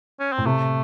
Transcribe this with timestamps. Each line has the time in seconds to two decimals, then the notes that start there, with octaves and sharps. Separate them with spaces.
0.20 C#4
0.33 C4
0.38 A2
0.46 C3 A3